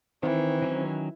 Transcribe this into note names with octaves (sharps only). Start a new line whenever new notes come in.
D#3 E3 C4
D#3 F#3 C#4